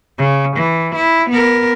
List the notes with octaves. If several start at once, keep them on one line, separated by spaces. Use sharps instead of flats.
C#3
E3
E4
B3 A#4